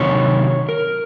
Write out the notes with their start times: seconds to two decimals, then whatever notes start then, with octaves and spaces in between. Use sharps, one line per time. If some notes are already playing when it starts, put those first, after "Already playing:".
Already playing: C3 D#3 F#3 C#5
0.69 A#4